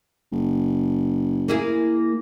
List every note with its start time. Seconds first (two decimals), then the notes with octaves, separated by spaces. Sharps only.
0.32 F#1
1.48 A#3 E4 G#4